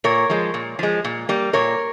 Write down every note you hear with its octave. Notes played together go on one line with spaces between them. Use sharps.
A#2 A#4 C#5
F3 G#3
A#2
F3 G#3
A#2
G3 A#3
A#2 A#4 C#5